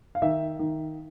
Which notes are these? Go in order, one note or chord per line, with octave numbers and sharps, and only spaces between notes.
F5
D#3 E5
D#3